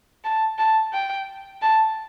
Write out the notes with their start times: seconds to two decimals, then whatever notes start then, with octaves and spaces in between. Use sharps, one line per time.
0.24 A5
0.58 A5
0.93 G5
1.62 A5